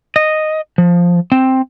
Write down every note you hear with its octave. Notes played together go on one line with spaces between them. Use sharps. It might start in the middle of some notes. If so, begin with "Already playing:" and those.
D#5
F3
C4